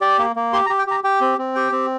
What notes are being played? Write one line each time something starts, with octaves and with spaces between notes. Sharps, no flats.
G4 D5
A#3
A#3
G4 C6
A#5
G4
G5
G4 A#5
G4 G5
C4
C4
G4 G5
C4